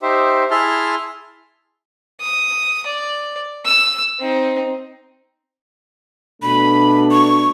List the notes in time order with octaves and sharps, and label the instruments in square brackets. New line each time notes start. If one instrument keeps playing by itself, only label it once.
[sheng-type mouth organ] D#4 G4 C5 E5
E4 G#4 E5 A5 C6 F6
[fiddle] D#6
D5
E6
C4 D#4
[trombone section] B2 A3 D4 [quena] B5
[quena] C#6